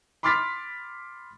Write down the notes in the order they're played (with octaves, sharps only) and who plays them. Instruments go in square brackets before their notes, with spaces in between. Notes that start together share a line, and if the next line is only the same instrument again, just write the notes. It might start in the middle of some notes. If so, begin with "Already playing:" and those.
[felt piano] B5 C6 D6 F6 A6 B6